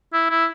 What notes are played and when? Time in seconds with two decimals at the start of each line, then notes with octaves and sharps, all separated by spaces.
0.13 E4
0.30 E4